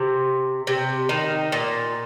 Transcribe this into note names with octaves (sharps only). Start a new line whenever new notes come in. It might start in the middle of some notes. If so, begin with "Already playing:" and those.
Already playing: C3
C3
D#3
A#2